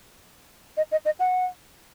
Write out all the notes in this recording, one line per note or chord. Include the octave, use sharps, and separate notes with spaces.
D#5
D#5
D#5
F#5